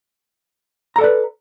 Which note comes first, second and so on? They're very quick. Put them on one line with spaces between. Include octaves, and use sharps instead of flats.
A#5 A4 D5 B4